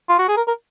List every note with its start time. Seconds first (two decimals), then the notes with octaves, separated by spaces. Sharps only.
0.09 F4
0.19 F#4
0.28 G#4
0.37 A#4
0.48 A#4